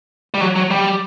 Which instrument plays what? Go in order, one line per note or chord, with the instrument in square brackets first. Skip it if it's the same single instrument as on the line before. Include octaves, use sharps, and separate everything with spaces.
[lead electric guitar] G3
F#3
F#3
G3